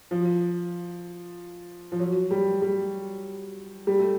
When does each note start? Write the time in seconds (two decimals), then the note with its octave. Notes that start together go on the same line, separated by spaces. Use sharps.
0.11 F3
1.92 F3
1.99 F#3
2.31 G3
2.62 G3
3.87 G3
3.99 A3